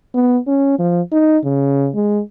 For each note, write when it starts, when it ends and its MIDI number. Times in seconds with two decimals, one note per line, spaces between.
0.14 0.38 59
0.47 0.75 61
0.79 1.01 53
1.12 1.38 63
1.44 1.89 49
1.94 2.21 56